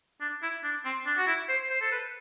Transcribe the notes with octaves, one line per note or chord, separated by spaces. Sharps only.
D4
E4
D4
C4
D4
F#4
E4
C5
C5
A4
B4